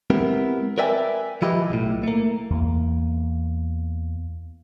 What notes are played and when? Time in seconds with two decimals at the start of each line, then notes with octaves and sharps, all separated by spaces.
0.10 G#3 B3 C4 E4 G4 A#4
0.78 A#4 B4 D5 E5 G5 G#5
1.42 D#3 F3 E4 G4 B4 D#5
1.70 B1 A2
2.03 A3 A#3
2.50 E2 A#3